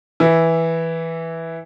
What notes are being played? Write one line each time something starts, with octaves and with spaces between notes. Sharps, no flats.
E3 E4